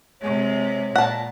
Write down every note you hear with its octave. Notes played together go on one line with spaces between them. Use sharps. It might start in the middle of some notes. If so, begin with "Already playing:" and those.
C3 G#3 C#5
A#2 F#5 A5